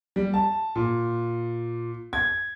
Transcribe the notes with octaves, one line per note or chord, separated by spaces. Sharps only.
G3
A5
A#2
G#6